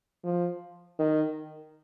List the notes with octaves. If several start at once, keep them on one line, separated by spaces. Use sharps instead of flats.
F3
D#3